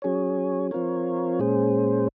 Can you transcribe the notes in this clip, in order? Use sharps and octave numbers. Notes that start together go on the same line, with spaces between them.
F#3 C#4 G#4 C#5
F3 C4 F4 A#4 C#5
A#2 G#3 C#4 G#4 C5